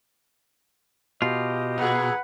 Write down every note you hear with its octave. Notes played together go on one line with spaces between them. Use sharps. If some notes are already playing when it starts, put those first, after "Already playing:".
B2 F4 G4 D#5
A#2 G#4 B4 F#5